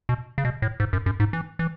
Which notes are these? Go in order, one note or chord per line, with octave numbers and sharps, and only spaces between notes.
B2
C#3
B2
A2
G#2
F#2
F#2
G#2
E3
E3